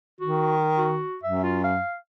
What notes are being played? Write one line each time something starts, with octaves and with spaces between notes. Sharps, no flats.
D#3 F#4
F#4
F#2 E5
F4
F5